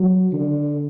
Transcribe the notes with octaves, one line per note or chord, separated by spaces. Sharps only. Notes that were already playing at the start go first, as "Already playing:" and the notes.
Already playing: F#3
D3